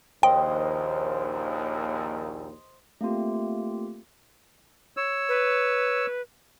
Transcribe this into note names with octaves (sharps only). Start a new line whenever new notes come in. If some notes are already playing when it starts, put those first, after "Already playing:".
A#1 D#2 C5 D#5 G5
A3 A#3 C4 F4 G4
C#5 E6
B4